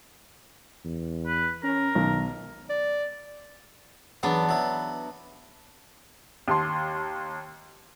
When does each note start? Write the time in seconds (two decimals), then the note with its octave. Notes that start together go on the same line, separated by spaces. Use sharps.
0.85 E2
1.27 B4
1.63 C#4 A#4
1.95 B1 D#3
2.69 D5
4.23 E2 F#3 B3 D4
4.49 F#3 E4
6.48 D#2 A5 C6